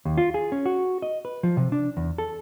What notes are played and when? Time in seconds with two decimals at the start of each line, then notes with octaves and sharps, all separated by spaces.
0.05 D#2
0.18 F4
0.34 G#4
0.52 C#4
0.66 F#4
1.02 D#5
1.25 B4
1.43 F3
1.57 C3
1.72 D4
1.97 E2
2.18 A4